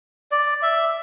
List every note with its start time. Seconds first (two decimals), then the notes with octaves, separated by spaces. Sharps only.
0.32 D5
0.62 E5